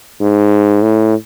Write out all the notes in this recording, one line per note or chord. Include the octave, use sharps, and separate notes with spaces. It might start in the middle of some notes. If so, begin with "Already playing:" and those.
G#2
A2